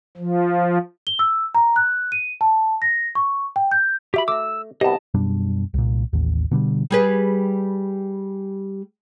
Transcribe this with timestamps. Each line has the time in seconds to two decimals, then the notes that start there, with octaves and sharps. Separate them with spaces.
0.17 F3
1.07 G7
1.19 E6
1.55 A#5
1.76 F#6
2.12 D#7
2.41 A5
2.82 A#6
3.15 C#6
3.56 G5
3.71 G6
4.14 F#4 G4 E5 B5
4.28 A3 A#5 D6 E6
4.81 C2 B2 B3 G4 D#5 A5
5.14 F#2 B2 G3 D4
5.74 C2 A#2
6.13 A1 D#2
6.51 B2 D3 G3
6.91 G3 G#4 B4